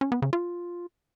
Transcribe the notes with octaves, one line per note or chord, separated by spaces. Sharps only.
C#4
B3
C#3
F4